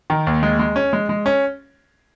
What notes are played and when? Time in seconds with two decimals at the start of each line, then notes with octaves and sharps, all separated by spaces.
0.10 D#3
0.27 D#2
0.43 G#3
0.59 G#3
0.76 C#4
0.93 G#3
1.09 G#3
1.26 C#4